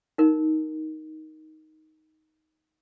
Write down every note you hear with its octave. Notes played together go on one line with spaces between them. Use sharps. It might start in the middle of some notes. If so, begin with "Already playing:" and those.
D#4 A#4